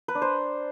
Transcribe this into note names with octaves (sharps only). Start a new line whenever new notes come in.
B4
D4
C5